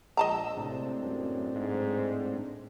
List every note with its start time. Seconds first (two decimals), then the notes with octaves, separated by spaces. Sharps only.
0.17 A#1 G#3 D#5 A5 A#5 E6
0.57 A2 C3 C4 D4
1.03 F#2
1.55 G#2